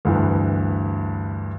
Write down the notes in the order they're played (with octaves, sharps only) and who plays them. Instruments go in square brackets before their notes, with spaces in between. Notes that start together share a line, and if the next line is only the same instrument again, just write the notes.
[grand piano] D2 G2 E3